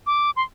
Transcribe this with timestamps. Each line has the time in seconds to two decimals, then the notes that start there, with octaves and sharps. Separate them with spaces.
0.07 D6
0.37 C6